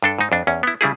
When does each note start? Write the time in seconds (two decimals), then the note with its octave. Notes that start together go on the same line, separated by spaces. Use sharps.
0.03 G2 D4 A4
0.19 G#2 D#4
0.32 F2 D4
0.47 E2 C#4
0.63 B3 E4
0.81 C#3 G3 E4 G#4